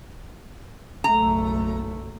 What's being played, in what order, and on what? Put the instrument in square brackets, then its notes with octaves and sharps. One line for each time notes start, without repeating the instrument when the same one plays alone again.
[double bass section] F#1 B1 A3 [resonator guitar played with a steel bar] A#5